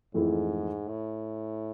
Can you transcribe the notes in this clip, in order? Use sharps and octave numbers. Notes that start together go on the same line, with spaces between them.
F2 G#2 E3 A3 E4 G#4
A2